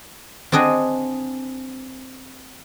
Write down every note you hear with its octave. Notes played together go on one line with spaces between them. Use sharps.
C4 D4 G#4 D#5 F#5